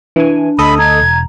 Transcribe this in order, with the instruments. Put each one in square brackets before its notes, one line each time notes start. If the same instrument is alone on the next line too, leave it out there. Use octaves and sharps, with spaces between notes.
[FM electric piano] E3 G#5 [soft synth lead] D4
[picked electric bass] D2 [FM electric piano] A4 D#5 [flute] B5
[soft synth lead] A#5 [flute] G#6
[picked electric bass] E1